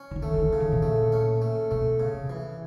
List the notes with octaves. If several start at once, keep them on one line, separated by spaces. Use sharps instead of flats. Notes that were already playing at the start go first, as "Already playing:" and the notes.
Already playing: C#4
E3
D#3
A3
F3
E3
C#3
D#3
B2
A#2 A3
C#4
A3
B2 A3
C#3
C3
E3